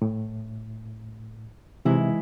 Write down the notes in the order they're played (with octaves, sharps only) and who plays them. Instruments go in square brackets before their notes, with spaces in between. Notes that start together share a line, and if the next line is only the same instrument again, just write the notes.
[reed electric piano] A2
[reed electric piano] C3 [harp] E3 G#3 E4